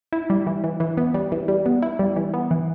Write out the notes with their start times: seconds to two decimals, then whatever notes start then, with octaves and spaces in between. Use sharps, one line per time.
0.13 E4
0.30 G3
0.47 E3
0.64 E3
0.80 E3
0.97 B3
1.14 G3
1.32 E3
1.48 G3
1.66 B3
1.82 E4
1.99 G3
2.16 E3
2.34 B3
2.51 E3